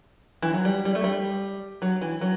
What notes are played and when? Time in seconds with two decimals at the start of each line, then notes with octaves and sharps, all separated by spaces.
0.42 E3
0.54 F#3
0.65 G3
0.85 G3
0.95 A3
1.04 G3
1.82 F#3
2.01 E3
2.21 F#3